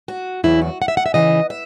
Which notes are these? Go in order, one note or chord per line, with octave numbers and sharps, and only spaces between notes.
F#4
E2 C#3 F#3 E4
F#4
F#5
E5
F#5
E5
D#2 C#3 E3 D#5
E5